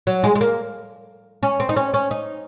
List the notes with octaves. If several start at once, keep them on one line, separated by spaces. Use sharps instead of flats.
F#3
G#3
G#3
A#3
C#4
C4
D#4
C#4
C#4
D#4